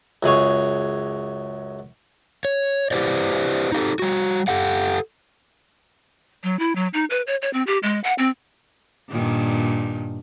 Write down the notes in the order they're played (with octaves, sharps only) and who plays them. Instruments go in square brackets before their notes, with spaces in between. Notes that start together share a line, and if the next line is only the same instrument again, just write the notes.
[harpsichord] C#2 F#2 G#4 C#5
[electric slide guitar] C#5
E4 G4 B4 C5 D5
D#4 G4 A4
G3 F#4
G4 A4 F#5
[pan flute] F#3
E4
F#3
D#4
B4
C#5
C#5
C4
G4
G#3
F#5
C4
[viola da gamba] G2 A#2 D#3